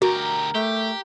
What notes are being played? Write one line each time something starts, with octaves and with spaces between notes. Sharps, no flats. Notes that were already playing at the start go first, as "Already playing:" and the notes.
D2 F#4 G4 A#4
A3 G4